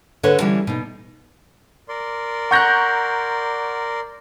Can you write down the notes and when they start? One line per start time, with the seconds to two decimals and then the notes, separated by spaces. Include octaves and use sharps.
0.23 D3 A4 B4 C#5
0.39 D3 E3 G3 C#4
0.67 B2 D#4
1.89 A#4 D5 C6
2.51 F#5 A#5 C#6 F#6 G6 A#6